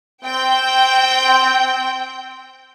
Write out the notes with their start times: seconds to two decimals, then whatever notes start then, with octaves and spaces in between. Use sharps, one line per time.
0.24 C4 G5